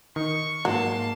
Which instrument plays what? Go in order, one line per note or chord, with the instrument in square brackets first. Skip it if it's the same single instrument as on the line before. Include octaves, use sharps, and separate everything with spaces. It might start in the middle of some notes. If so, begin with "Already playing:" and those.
[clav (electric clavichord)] D#3 [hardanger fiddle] C#6
[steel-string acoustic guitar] G#2 A#3 [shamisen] F#3 [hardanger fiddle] A5 C6